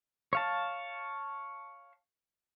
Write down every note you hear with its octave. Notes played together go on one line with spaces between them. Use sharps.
C#5 F5 A5